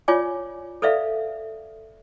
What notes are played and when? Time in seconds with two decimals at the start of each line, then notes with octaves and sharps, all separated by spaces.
0.08 F4 C#5 D5 G#5 D6
0.82 A4 B4 D5 E5 F5